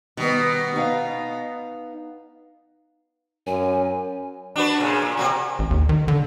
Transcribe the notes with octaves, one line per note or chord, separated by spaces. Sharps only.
B2 D#3 G3 B3
B3 D#4 F5
F#2 G#5
D4 F#4 B4
A#2 C#3
A#2
C3 A#3 F#4
A1
D#2
D#3
D3